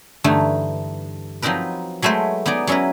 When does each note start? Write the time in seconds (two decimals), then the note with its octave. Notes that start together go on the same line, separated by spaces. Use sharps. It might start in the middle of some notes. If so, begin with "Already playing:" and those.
0.24 G2 D3 E3 A3 D#4
1.42 F3 F#3 C4 D#4 A#4 B4
2.02 F#3 G#3 A3 B4 C5
2.46 B3 D#4 G#4 D5 D#5
2.67 F#3 C#4 E4 A#4 B4